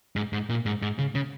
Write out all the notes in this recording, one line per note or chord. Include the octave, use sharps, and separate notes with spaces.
G#2
G#2
A#2
G#2
G#2
C#3
C#3